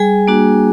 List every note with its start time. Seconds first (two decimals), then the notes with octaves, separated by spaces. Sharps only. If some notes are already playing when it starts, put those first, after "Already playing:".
Already playing: G3 G#4 G#5
0.28 A#3 D4 F#4